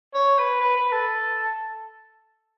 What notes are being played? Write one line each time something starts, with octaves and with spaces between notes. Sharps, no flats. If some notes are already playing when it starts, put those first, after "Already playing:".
C#5
B4
B4
B4
A4